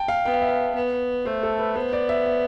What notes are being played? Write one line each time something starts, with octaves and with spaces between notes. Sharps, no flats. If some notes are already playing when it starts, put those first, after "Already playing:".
Already playing: G5 A5
F5
B3 G5
F5
E5
F5
B3
A3 C5
A4
B4
B3 C5
D5
E5
E5